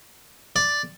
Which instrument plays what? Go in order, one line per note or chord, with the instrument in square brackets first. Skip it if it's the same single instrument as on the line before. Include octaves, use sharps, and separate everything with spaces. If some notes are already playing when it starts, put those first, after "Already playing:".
[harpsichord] D5